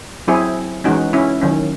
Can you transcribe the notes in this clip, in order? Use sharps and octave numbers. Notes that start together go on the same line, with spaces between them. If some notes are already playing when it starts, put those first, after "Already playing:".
F#3 C4 E4 G#4
E3 G#3 C#4 D#4 F#4
C#4 E4
D#3 F#3 C#4